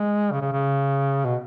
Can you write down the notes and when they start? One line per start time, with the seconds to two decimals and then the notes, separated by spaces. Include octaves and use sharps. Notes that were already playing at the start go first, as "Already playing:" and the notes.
Already playing: G#3
0.31 C#3
0.41 C#3
0.52 C#3
1.25 B2